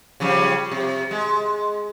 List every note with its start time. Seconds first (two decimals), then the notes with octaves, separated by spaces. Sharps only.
0.20 C#3 F3 G3
0.71 C3
1.11 G#3